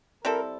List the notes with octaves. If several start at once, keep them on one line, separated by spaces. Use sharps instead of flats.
G3 C4 E4 A4 A#4